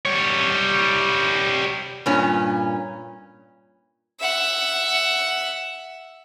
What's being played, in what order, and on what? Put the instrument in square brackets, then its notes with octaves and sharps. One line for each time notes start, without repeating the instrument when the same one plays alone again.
[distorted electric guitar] G3 C#5
[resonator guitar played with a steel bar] G2 A#2 C#4
[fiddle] E5 F#5